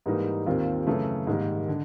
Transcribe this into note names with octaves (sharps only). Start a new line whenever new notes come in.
G#2 E3 G3 A#3 D#4
D#2 D#3 G3 C4 F4
F#2 C#3 E3 A3
G#2 D#3 G3 A#3
D3